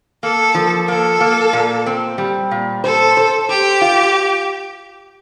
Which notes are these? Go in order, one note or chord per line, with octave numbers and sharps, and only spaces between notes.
A#3 A4
F3
A#3 A4
A#3
A#2
C4
G3
A#2
A4 C5
C5
G4 C5
F4